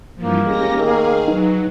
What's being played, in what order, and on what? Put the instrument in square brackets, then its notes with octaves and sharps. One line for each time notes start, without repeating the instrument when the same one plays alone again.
[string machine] G2 E3 F3 [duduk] A#3
[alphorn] G#3 [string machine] C#4 G4 A#6
[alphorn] D#3 [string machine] G#4 F5
[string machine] F#3 [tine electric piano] D#4 B4